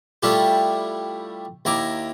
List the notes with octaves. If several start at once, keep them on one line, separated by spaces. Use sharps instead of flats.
G3 A3 D4 E4 F4 G4
D#2 E4 A#5 D6